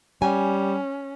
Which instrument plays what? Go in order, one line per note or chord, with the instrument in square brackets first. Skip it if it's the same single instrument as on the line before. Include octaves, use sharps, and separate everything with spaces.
[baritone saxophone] G3 [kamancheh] C#4 [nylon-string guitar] G#5